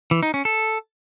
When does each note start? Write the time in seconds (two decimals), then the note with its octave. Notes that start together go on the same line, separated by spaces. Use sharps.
0.11 E3
0.23 D#4
0.34 C#4
0.45 A4